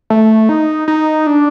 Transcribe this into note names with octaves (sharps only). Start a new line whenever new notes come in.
A3
D#4
D#4
D4